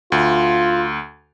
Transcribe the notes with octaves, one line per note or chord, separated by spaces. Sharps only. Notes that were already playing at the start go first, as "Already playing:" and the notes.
D2 F4